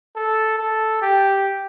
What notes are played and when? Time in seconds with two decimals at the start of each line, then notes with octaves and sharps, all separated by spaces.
0.16 A4
0.59 A4
1.02 G4